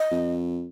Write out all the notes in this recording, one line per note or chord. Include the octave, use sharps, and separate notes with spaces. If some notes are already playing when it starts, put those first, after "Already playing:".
Already playing: D#5
F2